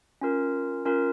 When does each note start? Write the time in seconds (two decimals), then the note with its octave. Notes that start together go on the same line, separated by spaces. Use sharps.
0.21 C#4 F4 A#4
0.85 C#4 F4 A#4